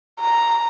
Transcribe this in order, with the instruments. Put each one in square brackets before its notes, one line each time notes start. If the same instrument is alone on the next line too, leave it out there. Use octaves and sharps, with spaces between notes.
[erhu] A#5